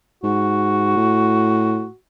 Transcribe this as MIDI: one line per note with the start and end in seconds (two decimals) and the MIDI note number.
0.23 0.93 44
0.23 1.95 66
0.97 1.87 45